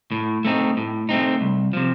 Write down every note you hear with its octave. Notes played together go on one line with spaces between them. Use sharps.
A2
A3 C4 D#4
A2
A3 C4 D#4
C2
C3 F3